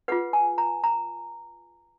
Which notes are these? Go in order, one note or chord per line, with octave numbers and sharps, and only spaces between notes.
F4 G#4 B4 F#5
G#5
A#5
A#5